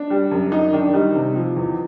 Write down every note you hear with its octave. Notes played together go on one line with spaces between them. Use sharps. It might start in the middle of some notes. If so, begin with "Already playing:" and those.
Already playing: D4
G3
F#2
F#2 D#4
D#3 D4
G3 D#4
C3
F3
E2